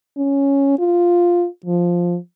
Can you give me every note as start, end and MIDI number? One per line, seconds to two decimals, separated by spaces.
0.17 0.77 61
0.79 1.47 65
1.66 2.17 53